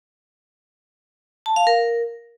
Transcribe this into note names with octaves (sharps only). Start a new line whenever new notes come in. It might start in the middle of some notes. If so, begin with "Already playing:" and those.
A5
F5
A#4